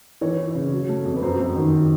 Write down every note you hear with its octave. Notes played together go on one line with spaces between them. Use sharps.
E3 C#5
E3
C#3
F#3
A3
F2
B4
F#2 C5
F#2
D#3